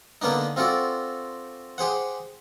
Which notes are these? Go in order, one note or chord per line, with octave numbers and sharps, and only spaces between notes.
D3 A#3 B3 D4 D#4
C4 F4 F#4 A4 D5
G4 G#4 C5 F#5